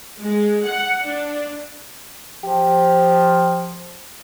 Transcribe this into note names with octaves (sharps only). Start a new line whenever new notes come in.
G#3
F#5
D4
F3 G4